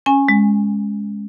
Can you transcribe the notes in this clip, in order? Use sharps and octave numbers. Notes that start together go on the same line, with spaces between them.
C#4 G#5
G#3